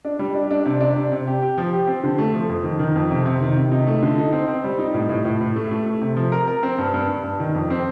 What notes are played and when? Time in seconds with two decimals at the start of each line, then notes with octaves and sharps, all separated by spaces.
0.05 D4
0.19 G3
0.35 D4
0.51 D4
0.66 C3
0.81 D4
0.96 C3
1.12 C3
1.27 G4
1.42 G4
1.58 F3
1.73 G4
1.87 C4
2.04 D3
2.18 A3
2.34 F3
2.49 F2
2.64 D#3
2.79 D#3
2.95 F2
3.11 C3
3.26 C3
3.42 D#3
3.56 C3
3.72 D#4
3.87 A3
4.03 D3
4.18 D#4
4.33 C4
4.48 C4
4.64 G3
4.79 D#4
4.94 A2
5.09 A2
5.25 A2
5.41 A2
5.56 A3
5.71 A3
5.86 A3
6.02 C3
6.17 F3
6.32 A#4
6.47 A#4
6.63 C4
6.78 G2
6.94 G2
7.09 G2
7.24 G2
7.40 D#3
7.55 F2
7.70 C4